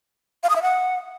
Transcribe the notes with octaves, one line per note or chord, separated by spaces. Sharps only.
F5
D#6
E5
F#5